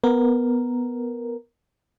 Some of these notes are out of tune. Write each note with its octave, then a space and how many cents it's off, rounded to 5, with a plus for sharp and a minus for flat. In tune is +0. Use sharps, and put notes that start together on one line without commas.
B3 +0 A#4 +0